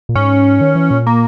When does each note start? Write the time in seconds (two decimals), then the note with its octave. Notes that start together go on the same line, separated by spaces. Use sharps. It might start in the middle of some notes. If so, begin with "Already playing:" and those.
0.09 A#2
0.15 G#2 C#4
0.61 D#3
0.76 E3
0.91 A#2
1.07 A#3